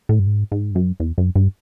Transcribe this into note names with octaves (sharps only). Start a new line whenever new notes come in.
A2
G2
G#2
G#2
G2
F#2
E2
F#2
G2